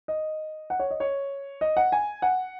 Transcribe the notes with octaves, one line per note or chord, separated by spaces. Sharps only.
D#5
F#5
C#5
D#5
C#5
D#5
F#5
G#5
F#5